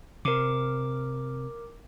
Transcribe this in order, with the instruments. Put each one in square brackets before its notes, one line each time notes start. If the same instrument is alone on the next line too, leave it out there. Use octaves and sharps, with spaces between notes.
[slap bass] C3 [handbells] A#4 D6